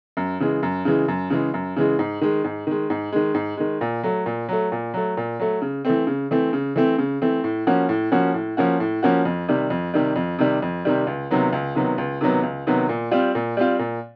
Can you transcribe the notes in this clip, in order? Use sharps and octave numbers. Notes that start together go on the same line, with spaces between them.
F#2
C#3 E3 G#3
F#2
C#3 E3 G#3
F#2
C#3 E3 G#3
F#2
C#3 E3 G#3
G#2
D#3 G#3
G#2
D#3 G#3
G#2
D#3 G#3
G#2
D#3 G#3
A#2
F#3 A3
A#2
F#3 A3
A#2
F#3 A3
A#2
F#3 A3
C#3
E3 A3 C4
C#3
E3 A3 C4
C#3
E3 A3 C4
C#3
E3 A3 C4
A2
F3 A#3 C#4 F#4
A2
F3 A#3 C#4 F#4
A2
F3 A#3 C#4 F#4
A2
F3 A#3 C#4 F#4
F2
C3 D#3 G3
F2
C3 D#3 G3
F2
C3 D#3 G3
F2
C3 D#3 G3
C#2
C3 D#3 F#3 B3
C#2
C3 D#3 F#3 B3
C#2
C3 D#3 F#3 B3
C#2
C3 D#3 F#3 B3
A#2
G3 C4 F4
A#2
G3 C4 F4
A#2